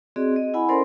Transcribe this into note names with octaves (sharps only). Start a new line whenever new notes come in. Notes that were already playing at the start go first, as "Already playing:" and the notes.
C4 F#4 G#4 D5 D#5
D#5
E4 F#5 G#5 B5
C#4 A4 A#4 C5 D5 C6